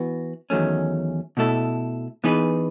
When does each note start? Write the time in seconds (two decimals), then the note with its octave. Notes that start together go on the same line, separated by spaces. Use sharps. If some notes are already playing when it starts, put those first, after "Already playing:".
Already playing: E3 B3 F#4
0.50 E2 D#3 F#3 A3 C#4
1.37 B2 A3 E4 A4
2.24 E3 B3 D#4 G#4 B4